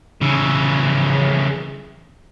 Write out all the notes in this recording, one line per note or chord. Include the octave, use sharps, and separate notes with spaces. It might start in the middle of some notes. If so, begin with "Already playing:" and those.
C#3 E3